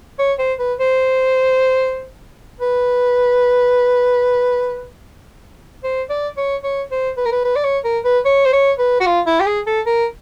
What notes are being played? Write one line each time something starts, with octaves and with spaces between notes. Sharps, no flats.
C#5
C5
B4
C5
B4
C5
D5
C#5
C#5
C5
B4
A#4
B4
B4
D5
C#5
A#4
B4
C#5
C5
C#5
B4
F#4
F4
E4
G4
G#4
A4
A#4